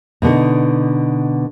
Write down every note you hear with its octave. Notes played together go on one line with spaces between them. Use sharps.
B2 D3 B3 D#4